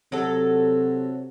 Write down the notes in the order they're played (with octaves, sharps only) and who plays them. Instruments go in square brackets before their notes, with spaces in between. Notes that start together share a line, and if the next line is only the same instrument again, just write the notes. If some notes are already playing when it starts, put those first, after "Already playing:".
[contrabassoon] C3 [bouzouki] F#3 A4